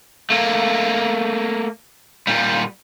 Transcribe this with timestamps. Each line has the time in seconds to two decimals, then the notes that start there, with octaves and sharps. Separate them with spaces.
0.30 A3 A#3
2.27 A#2 G3